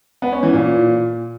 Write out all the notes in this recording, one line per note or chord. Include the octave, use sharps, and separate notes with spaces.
B3
C#4
E3
A#2